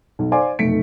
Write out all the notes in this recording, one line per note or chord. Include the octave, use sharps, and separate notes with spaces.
B1
C5 D5 F5 G#5 C6 D6
F1 B1 A3 B6 C#7 D7